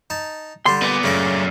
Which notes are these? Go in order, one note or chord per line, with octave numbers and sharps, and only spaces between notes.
D#4 A5
D3 G3 D4 C6
A#3 B3 D5
F#2 C#3 A3 D6